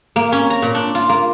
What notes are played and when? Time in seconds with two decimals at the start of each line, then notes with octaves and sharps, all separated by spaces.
0.16 A#3
0.32 C#4
0.50 A#5
0.62 A#2
0.75 D4
0.95 F4
1.09 A#3